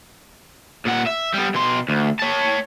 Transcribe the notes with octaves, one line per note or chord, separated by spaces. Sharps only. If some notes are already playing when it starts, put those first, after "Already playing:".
A#2 F#5
E5
G3 B3
B2 C6
D2
C#5 A5